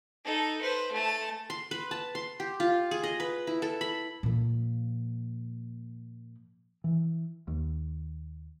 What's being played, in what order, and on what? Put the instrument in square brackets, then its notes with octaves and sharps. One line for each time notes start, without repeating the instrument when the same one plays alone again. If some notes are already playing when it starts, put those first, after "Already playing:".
[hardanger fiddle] D#4 A4
B4 C5
A3 A5
[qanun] C6
B4
A5
C6
G4
F4
G#4
D#5
B4
E4
A4
B5
[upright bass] A#2 F3
[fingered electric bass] E3
D#2